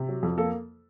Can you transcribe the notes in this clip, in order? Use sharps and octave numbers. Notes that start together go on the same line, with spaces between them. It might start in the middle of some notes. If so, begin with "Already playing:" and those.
Already playing: C3
F#3
F2
A#3 A4